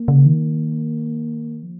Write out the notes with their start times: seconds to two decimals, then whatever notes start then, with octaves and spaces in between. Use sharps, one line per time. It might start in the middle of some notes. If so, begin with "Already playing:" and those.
Already playing: A#3
0.08 C#3
0.26 D#3
1.63 F3